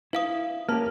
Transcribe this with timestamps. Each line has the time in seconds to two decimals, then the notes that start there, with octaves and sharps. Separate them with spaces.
0.13 E4 B4 F5 D#6
0.69 A#3 C#4 G4 A#4 A5 F6